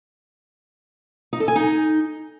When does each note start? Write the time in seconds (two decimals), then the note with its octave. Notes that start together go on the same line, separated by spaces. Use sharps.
1.33 D#4
1.40 A4
1.48 G#5
1.56 D#4